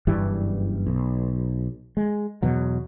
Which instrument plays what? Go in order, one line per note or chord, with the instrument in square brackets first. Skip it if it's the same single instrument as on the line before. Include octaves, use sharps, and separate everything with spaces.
[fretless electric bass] F#1 G2 E3 G3
B1
G#3
E2 B2 F#3